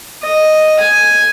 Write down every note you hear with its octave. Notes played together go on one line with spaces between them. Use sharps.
D#5
G#5